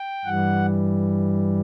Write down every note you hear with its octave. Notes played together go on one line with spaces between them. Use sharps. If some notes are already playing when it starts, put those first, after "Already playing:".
Already playing: G5
G2 E3 G3 F#5